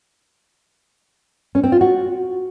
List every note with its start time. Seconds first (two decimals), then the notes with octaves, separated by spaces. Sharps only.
1.55 C#4
1.64 C4
1.72 F4
1.81 F#4